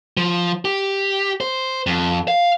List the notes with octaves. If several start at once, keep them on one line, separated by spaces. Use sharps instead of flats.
F3
G4
C5
F2
F5